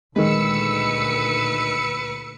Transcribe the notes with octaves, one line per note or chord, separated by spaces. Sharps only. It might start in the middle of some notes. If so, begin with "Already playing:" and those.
D2 A#2 D#3 G#3 B4 E6 C#7